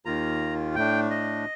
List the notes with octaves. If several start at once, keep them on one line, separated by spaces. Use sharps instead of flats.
D#2 D#3 A#3 F4 A#5
A2 A3 D4 G5
D#5